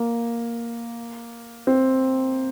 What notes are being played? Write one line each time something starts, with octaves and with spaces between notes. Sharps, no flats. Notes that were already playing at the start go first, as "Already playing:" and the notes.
Already playing: A#3
C4